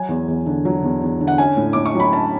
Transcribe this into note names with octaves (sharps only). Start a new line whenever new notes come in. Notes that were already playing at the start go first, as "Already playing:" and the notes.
Already playing: F#3 G#5
E2
E2
D3
F#3
E2
E2
D3
F#5
C#4 G#5
A2
A2 D6
C#6
F#3 B5
C#4 A5